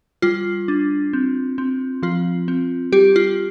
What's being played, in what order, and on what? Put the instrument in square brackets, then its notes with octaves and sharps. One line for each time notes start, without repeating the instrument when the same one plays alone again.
[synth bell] G3 F4
D4
C4
C4
F3 F4
C4
G3 G4
F4